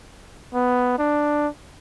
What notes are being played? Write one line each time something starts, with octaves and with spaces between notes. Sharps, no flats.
B3
D4